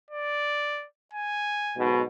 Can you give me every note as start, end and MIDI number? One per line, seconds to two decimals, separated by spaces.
0.11 0.86 74
1.13 1.84 80
1.76 2.01 35
1.76 2.01 44
1.76 2.01 47